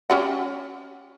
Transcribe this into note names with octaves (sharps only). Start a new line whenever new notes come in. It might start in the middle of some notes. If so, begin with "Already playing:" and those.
C#4 G4 F#5